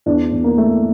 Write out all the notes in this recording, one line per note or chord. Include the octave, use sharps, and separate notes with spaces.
E2 D4
E2
A#3
A3